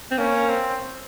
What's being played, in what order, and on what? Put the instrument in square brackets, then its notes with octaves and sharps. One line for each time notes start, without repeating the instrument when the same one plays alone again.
[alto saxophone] C4
[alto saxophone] A#3 [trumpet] C#4
[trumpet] C4